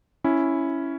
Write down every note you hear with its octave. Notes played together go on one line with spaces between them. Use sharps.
C#4 E4